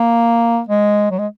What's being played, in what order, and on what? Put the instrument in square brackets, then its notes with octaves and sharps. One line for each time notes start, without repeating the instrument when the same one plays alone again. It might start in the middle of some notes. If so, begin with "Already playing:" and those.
Already playing: [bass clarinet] A#3
G#3
F#3
G#3